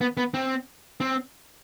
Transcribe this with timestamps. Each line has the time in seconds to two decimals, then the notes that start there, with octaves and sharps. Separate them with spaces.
0.01 B3
0.17 B3
0.34 C4
1.00 C4